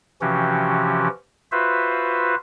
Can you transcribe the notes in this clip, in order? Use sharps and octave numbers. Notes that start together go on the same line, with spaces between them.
C3 E3 F3 C#4 F#4 G4
F4 F#4 B4 C5 E5